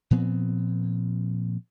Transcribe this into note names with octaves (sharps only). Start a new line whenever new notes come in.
A#2 F3 B3 C4